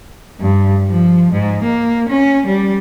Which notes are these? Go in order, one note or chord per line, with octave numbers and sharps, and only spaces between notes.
G2
F3
G#2
A#3
C#4
G3